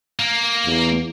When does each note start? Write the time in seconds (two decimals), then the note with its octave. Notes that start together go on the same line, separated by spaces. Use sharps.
0.19 A#3
0.66 E2